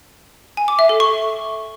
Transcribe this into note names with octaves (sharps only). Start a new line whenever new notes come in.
G#5
D6
E5
A4
C#6